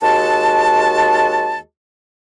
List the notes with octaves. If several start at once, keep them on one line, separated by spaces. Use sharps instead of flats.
D#2 G#3 F#4 A5